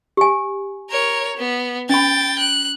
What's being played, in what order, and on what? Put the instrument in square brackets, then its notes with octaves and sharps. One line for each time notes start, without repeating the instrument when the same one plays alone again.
[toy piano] G4 G#5
[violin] A#4 C#5
B3
[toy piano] C#4 B5 [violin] G5 A6
[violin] F#6